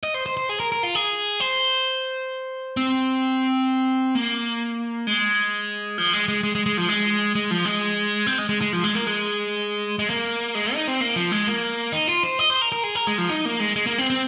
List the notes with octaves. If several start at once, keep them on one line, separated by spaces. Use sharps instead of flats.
D#5
C5
C5
C5
G#4
A#4
A#4
F4
G#4
C5
C4
A#3
G#3
F3
G#3
G#3
G#3
G#3
G#3
F3
G#3
G#3
F3
G#3
C4
G#3
G#3
G#3
F3
G#3
A#3
G#3
G#3
A#3
G#3
D#4
C4
A#3
F3
G#3
A#3
D#4
F4
C5
D#5
C5
A#4
A#4
G#4
A#4
G#3
F3
D#4
A#3
G#3
G#3
A#3
C4
C4